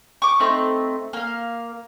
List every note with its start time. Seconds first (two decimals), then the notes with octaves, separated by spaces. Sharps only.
0.22 C#6 D6
0.40 A3 C4 D#4 F#6
1.13 A#3 F5